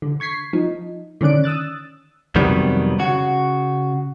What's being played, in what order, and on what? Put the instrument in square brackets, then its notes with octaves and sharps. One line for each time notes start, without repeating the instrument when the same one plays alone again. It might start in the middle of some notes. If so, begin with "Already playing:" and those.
[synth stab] D3
C#6 G#6 B6 C7
F3 D#4
D3 D#3 C#4 D5 F#6 D7
D#6 E6 F#6 A6
[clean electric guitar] F2 C3 D#3 F#3 G3 B3
C#3 F#4